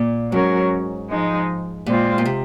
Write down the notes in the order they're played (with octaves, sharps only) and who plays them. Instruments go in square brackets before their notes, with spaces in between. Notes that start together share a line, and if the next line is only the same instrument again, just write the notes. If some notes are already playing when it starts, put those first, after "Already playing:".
Already playing: [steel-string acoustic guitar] A#2
[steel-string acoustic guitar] G#2 [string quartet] F#3 C#4 F#4 A#4 C#5
[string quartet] F3 G#3 D#4
[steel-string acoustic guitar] A#2 [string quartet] G#3 C4 F4
[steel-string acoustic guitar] A#2
C3